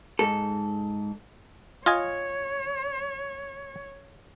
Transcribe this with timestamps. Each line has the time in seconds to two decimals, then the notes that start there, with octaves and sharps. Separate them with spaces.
0.19 G#2 A4
1.86 F4 C#5 D#5 G#5